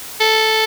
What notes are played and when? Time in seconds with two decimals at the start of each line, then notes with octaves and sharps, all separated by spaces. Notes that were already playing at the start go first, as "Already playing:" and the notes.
0.21 A4